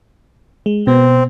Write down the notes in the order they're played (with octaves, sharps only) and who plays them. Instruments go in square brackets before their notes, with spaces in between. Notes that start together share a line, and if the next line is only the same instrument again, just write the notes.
[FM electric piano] G#3
[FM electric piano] B2 B3 [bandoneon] C4